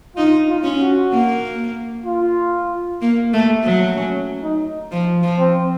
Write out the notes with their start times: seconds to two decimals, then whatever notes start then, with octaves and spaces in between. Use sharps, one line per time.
0.16 D#4 F4
0.49 F4
0.64 C#4
0.80 F#4
1.12 A#3
2.06 F4
3.02 A#3
3.33 A3
3.64 F#3
3.96 C#4
4.43 D#4
4.92 F3
5.23 F3
5.39 C4